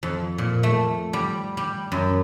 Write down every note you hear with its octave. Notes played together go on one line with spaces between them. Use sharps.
F2
A#2
A3
G3
G3
F#2